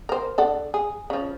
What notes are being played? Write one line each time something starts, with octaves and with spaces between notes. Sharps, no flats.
A#4 C5
D4 A4 F#5
G#4
C#3 F3